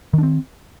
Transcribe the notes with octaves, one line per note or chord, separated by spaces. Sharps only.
D#3 C4 D4